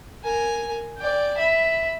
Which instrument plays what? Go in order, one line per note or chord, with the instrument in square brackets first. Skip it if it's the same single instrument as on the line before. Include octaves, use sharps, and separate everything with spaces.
[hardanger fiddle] A#4 G#5
D5 G5
E5 B5